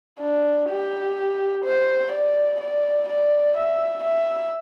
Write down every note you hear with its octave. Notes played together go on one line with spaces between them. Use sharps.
D4
G4
C5
D5
D5
D5
E5
E5